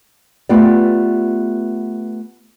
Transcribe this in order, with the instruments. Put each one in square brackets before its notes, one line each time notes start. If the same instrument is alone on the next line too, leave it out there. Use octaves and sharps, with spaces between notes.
[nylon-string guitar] A3 B3 F4 G4 D5